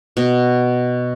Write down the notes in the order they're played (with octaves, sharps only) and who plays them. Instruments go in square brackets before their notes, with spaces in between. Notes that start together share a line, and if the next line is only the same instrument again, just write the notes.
[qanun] B2